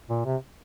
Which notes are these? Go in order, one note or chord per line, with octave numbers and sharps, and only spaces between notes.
A#2
C3